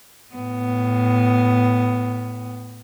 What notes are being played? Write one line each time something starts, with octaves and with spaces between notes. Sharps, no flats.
A2 B3